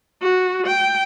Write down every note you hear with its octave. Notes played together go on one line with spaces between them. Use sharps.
F#4
G5